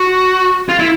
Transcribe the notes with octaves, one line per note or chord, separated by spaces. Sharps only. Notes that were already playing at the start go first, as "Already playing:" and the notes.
Already playing: F#4
F4
E4